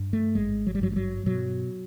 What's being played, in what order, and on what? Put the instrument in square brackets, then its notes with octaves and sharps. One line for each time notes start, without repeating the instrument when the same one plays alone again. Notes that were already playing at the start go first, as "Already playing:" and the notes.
Already playing: [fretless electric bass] G2
A3
G#1 G#3
F#3
G3
G2 F#3
G3
F#3
B2 F#3